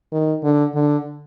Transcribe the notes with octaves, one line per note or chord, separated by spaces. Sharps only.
D#3
D3
D3